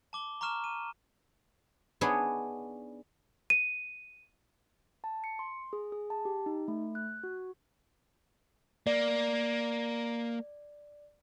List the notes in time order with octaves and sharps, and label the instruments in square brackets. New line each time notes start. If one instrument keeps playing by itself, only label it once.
[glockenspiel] A5 D6 G7
A#5 C#6 D6 F6 E7
D#7
[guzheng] B3 D4 D#4 G#4 C#5
[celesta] D#7
[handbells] A5
C#7
C6
G#4
G#4
A5
G4
D#4
A3
F#6
F#4
[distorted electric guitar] A#3 [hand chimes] D5